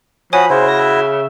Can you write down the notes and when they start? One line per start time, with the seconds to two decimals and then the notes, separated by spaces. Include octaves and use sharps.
0.33 F3 F#4 C#5 G#5 B5 D#6
0.50 C#3 E4 F#4 C5
0.68 A#6
0.80 E5